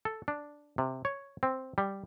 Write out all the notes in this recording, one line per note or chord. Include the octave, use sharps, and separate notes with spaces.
A4
D4
C3
C#5
C4
G3